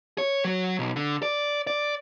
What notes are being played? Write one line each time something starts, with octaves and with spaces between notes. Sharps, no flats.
C#5
F#3
B1
D3
D5
D5